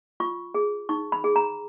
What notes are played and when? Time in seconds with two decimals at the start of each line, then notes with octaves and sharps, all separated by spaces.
0.20 F4 C#6
0.55 G#4
0.89 D#4 C#6
1.12 B5
1.24 G#4
1.36 A#5